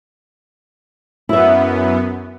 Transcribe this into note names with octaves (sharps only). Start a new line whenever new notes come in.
F#2 B3 E4 E5